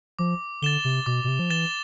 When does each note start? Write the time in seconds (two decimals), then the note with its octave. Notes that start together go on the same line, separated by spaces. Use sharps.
0.19 F3 D6
0.62 D3 A6 E7 G7
0.85 C3
1.06 B2 D6
1.24 B2
1.28 C3
1.39 F3
1.50 E3 A6 E7 G7